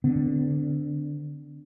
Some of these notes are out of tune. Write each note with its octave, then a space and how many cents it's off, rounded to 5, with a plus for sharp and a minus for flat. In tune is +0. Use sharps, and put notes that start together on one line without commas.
D3 +0 C4 -45